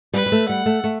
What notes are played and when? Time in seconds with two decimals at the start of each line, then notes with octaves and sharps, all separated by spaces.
0.13 G3 B4
0.26 G3
0.32 A3
0.49 G3 F#5
0.66 A3
0.84 A3